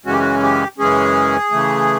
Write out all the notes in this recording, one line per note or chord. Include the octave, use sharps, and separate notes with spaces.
F#2 C#3 E3 G#3 C#4 F#4
G4
F#4
G4
F#2 C#3 E3 G#3 C#4 G#4
C#3 E3 A3